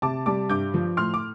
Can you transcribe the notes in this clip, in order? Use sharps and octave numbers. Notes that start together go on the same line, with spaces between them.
C3 A5 D6
G3 A5 D6
G2 D6 G6
F3
A2 C6 F6
D6